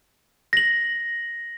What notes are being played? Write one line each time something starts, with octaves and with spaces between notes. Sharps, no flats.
A#6 F#7